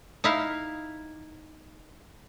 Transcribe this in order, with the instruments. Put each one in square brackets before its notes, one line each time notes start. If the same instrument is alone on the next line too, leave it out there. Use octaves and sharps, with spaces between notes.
[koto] D#4 E4 F5